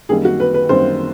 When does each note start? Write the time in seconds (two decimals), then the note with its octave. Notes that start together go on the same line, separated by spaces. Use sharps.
0.09 F#2 D#3 G3 A#3 G#4
0.25 F#4
0.40 B4
0.54 B4
0.69 F#2 D#3 G3 A#3 C5